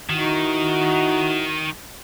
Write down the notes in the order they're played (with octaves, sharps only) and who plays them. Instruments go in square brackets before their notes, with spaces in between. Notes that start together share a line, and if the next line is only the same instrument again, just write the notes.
[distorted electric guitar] D#3 [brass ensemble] D#4 E4 F#4